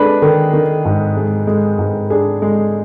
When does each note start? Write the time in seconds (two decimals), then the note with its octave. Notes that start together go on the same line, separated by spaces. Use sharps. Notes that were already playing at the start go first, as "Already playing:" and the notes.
Already playing: G#3 D4 G#4 B4
0.22 D#3
0.53 D#3
0.85 G#2
1.17 G#3
1.47 G#3
1.79 G#2
2.10 D4 G#4
2.42 G#3